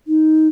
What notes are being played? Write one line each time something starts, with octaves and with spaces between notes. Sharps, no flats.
D#4